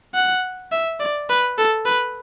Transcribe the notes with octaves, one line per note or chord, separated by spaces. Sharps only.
F#5
E5
D5
B4
A4
B4